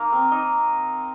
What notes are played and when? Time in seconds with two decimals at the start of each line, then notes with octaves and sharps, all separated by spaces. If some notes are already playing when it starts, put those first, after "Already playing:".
Already playing: A#3 D#4
0.12 C4
0.32 D#4